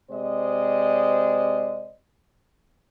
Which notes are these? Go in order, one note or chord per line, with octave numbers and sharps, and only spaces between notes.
C3 G#3 C5 D5 D#5